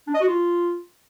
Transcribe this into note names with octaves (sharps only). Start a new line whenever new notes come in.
D4
D#5
F#4
F4